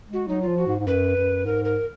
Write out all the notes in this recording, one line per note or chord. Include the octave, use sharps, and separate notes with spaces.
G#3
F#4
F#3 D#4
F4
F3
F#4
G#2
G#2
F#2 B4
F#2
G#2 A#4
A#4